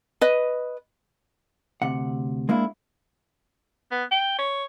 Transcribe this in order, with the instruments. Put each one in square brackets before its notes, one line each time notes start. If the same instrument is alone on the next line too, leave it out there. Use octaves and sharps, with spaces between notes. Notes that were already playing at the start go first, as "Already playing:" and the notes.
[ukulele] B4 D#5
[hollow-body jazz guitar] D2 C3 F#5
G#3 A#3 D4 E4
[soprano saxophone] B3
G5
C#5